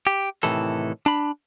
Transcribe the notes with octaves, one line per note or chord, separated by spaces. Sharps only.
G4
A2 C3 D#3 E3 A4
D4 B5